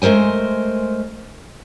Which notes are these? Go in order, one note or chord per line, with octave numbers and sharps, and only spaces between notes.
G#3 A3 A#4 C5 G#5